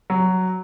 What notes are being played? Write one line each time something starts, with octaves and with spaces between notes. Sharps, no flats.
F#3